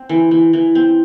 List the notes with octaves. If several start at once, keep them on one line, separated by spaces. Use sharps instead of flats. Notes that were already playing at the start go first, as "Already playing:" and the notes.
Already playing: C4
E3
E3
E3
C4